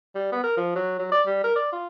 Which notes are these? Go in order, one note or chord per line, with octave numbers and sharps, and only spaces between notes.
G3
B3
A#4
F3
F#3
F#3
D5
G3
A#4
D5
F4